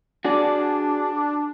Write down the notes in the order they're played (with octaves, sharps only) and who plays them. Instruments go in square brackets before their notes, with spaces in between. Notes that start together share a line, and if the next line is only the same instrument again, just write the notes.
[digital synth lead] D4 [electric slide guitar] F#4 G#4 D5